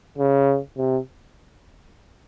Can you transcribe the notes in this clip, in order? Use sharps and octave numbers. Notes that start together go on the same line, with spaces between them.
C#3
C3